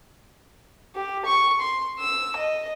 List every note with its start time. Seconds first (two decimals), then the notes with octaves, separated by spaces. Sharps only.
0.95 G4
1.25 C#6
1.60 C6
1.99 E6
2.36 D#5